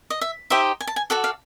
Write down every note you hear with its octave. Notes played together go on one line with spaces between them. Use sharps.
D#5
E5
D#4 G4 C5 D#5 E5
G#5
A5
G#5
F#4 A4 D5 F#5
F5